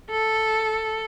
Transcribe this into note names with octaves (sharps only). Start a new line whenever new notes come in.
A4